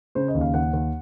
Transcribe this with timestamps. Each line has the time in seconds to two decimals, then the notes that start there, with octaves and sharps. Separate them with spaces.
0.15 C#3 C5
0.28 D#5
0.35 D#2
0.41 F5
0.54 D#2 F#5
0.73 D#2